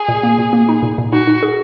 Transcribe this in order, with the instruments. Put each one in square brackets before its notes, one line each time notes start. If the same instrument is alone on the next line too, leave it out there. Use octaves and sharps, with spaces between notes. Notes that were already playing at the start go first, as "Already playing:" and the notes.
Already playing: [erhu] G#4
[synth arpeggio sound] A#2
A#3
A#2
A#3
D#4
A#2
A#2
[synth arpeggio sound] D#4 [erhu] F#4
[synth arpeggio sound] D#4
G#4